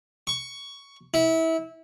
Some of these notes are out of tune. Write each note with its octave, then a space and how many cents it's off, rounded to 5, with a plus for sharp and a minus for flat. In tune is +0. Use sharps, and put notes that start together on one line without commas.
C#6 +10
E4 -25